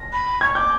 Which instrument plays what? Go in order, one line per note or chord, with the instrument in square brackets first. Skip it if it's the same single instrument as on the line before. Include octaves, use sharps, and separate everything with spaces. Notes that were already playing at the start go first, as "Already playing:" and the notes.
Already playing: [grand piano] A#6
[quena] B5
[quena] C#6 [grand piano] G#6
[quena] D6 [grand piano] G6